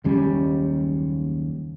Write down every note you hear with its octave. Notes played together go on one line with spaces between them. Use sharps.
F#1 D#2 G3 C#4